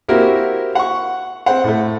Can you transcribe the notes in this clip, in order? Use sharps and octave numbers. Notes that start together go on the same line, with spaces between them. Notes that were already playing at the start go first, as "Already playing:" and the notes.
A#3 C4 E4 F#4 G4 A#4
F#5 C#6
C4 C5 F#5
A2 A3